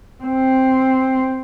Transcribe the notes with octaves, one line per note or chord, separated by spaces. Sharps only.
C4